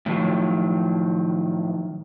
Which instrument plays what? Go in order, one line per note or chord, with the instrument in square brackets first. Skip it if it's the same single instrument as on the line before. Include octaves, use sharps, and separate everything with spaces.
[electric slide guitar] A2 D#3 F3 F#3